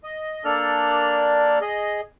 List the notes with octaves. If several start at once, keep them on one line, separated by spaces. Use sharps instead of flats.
D#5
A#3 D4 A4 D5 F6
G#4 D#5